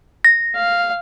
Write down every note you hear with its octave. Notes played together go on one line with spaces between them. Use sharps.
A#6
F5